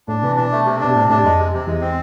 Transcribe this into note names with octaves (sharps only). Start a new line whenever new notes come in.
A2 D4
C3 E3
B2 D4
A3
C3
B2 D4
A2 C3
A2 D4
F2 G#3
C3
E2 C3
E2 G#3
C4